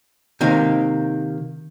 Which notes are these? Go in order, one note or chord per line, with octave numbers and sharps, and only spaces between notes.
C3 D#3 A#3